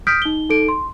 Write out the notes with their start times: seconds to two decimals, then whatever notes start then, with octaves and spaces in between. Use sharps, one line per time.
0.07 D#6 F6 G6 B6 D7
0.22 D#4 G7
0.49 D#4 A4 D7
0.68 C6